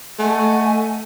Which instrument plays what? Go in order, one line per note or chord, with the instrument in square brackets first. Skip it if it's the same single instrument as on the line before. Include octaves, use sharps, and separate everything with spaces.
[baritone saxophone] A3 [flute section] D#5 F#5 G#5